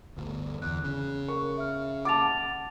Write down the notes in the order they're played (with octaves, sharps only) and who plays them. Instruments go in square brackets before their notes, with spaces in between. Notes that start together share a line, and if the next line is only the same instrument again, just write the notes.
[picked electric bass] G1 D2
[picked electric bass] E2 [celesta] F#6
[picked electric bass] C#3
[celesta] A#4 [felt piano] C#6
[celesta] E5 F6
[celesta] F#5 A6 F7 [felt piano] A5 D6